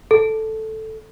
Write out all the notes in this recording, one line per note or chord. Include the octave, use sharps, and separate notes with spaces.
A4